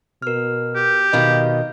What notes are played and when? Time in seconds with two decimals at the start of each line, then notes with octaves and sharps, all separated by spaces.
0.22 B2 A#4 F6
0.75 G4
1.13 B2 D#3 D#5 F5 B5